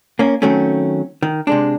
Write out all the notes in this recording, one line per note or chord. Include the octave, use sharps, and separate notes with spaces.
A#3 C#4
D#3 F#3 A3 C4 C#4
D#3
C3 G#3 D4